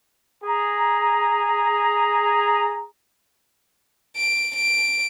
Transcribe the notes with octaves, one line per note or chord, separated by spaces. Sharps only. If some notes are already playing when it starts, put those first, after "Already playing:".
G#4 A#5
D7
D7